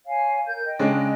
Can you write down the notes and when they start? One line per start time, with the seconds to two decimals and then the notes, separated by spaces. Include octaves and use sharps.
0.05 C#5 F5 G#5
0.47 A#4 G6
0.64 D#5 G5
0.79 C#3 G#3 D4